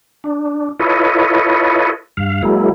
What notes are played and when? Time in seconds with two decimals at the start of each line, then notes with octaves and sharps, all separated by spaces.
0.24 D4
0.80 E4 F4 A4 B4 C#5 D#5
2.17 G2 F5
2.43 F#3 G#3 A#3 E4